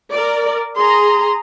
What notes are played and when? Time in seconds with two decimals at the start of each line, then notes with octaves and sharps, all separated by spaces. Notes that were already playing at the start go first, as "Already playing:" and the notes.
0.12 A#4 D5
0.76 G#4 A#5 C6